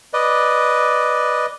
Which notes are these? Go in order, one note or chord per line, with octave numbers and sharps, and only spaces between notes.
B4 D5 D#5